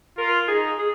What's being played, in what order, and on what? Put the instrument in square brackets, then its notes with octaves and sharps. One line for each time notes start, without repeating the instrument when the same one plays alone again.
[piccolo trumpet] F4 [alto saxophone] A#4
[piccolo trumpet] D#4 [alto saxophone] G#4
[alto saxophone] G#4